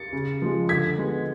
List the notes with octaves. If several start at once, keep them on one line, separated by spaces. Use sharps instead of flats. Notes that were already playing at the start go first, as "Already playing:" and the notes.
Already playing: A6 C#7
C#3
F3 G#3
D3 G#6 B6
G#3 B3